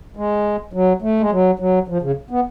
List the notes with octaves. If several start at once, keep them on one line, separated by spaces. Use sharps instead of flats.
G#3
F#3
A3
G#3
F#3
F#3
F3
C#3
B3